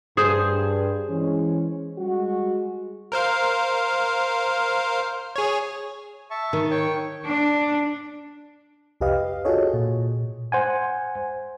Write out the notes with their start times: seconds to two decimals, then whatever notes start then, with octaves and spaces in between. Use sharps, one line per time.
0.17 G2 G#4 C5
1.09 E3 G#3 C#4
1.99 G3 G#3 F#4
3.12 A#4 C5 F5
5.36 G#4 C#5
6.31 E5 A5 C#6
6.53 D#3
6.70 C#5 G5 C#6
7.25 D4
9.01 C2 F2 G4 B4 D#5 F5
9.45 F4 F#4 G#4 A4 C#5 D#5
9.74 A#2
10.52 C5 F#5 G#5